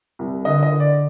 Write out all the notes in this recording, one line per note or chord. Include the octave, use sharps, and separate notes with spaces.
C2
D3 D#5
D#5
D3
D5